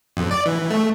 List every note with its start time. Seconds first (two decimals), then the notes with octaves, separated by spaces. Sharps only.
0.17 F2
0.31 D5
0.46 E3
0.71 A3